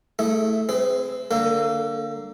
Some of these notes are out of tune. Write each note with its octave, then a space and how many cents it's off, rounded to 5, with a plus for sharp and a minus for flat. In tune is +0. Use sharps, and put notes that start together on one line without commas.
A3 +0 E4 -15 G#4 +0
C4 +0 G#4 +0 B4 +45
D3 +0 A#3 -15 A4 +25